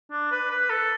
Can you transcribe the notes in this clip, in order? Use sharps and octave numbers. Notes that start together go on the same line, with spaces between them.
D4
B4
B4
A4